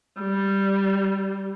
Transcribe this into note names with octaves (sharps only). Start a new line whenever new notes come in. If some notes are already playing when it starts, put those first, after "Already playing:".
G3